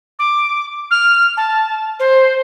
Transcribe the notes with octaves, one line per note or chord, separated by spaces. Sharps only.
D6
F6
A5
C5